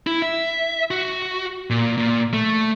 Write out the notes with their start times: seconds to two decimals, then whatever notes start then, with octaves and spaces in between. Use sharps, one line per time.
0.07 E4
0.22 E5
0.91 F#4
1.70 A#2
1.98 A#2
2.34 A3